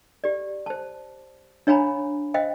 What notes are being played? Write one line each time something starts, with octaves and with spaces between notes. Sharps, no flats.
G4 D5
C5 A5
D4 C#5 F5 G#5 A#5 B5
C5 D#5 F5 G5